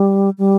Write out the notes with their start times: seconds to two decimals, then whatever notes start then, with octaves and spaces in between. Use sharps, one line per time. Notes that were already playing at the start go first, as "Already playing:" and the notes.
Already playing: G3
0.38 G3